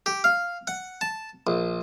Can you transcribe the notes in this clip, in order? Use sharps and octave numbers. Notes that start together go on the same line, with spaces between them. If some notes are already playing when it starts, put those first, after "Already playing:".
G4
F5
F#5
A5
A#1